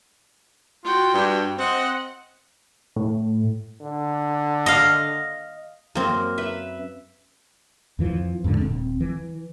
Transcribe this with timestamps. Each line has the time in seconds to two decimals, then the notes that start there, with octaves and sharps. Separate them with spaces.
0.84 F4 F#4 G5
1.14 G2
1.58 C4 D#5 F#5
2.96 A2
3.81 D3
4.66 D#5 F5
5.95 F#2 A#3 C4 A#4 C6
6.38 B4 E5
7.99 F2 E3 F3
8.44 F2 G#2 B2 D3
8.57 D#1 C4
9.01 E3